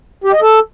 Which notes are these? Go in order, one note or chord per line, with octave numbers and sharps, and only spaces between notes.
G4
D#5
A4